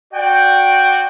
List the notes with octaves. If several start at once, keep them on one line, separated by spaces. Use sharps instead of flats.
F#4 D5 G5